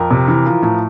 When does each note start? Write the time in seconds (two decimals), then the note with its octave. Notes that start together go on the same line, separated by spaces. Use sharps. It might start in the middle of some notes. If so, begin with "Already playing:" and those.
Already playing: F2 A#4
0.11 C3
0.28 E3
0.46 F3
0.62 A2